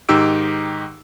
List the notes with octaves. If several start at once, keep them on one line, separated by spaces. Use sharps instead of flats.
G#2 D#3 D#4 G4 E6 D7